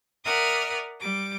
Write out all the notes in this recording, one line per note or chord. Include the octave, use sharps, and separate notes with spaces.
A#4 D5 E5 F#5 D#6 F6
G3 D6